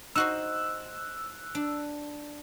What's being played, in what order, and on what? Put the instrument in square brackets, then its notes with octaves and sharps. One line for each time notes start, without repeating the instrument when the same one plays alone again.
[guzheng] D#4 F#4 C5 [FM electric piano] E6 F#6
[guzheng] D4